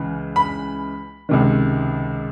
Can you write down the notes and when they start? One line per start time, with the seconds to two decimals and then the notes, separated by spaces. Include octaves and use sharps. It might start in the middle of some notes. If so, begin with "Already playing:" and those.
Already playing: C#2 C#3 E3
0.36 B5
1.29 C#2 C3 D#3